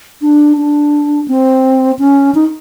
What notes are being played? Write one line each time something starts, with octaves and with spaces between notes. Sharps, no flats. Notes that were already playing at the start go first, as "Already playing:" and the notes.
D4
D4
C4
C#4
D#4